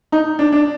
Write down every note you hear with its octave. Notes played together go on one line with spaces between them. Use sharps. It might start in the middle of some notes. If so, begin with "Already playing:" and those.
D#4
D4
D4